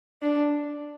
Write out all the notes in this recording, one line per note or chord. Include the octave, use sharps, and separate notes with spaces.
D4